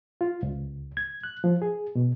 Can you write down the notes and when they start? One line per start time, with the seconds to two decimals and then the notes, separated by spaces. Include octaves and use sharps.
0.21 F4
0.43 C#2
0.97 G#6
1.24 F#6
1.44 F3
1.62 G#4
1.95 B2